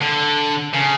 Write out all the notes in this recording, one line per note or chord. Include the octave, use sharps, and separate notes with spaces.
D3
C#3